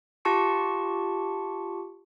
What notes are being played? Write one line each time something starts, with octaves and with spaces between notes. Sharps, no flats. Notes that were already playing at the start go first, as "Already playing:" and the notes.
F4 G4 A5 C#6 C#7